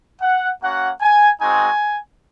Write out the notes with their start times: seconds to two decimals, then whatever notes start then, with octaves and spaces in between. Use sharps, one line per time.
0.21 F#5
0.61 A#3 C#4 F#4 F#5
1.01 G#5
1.40 G#3 C4 D#4 F#4 G#5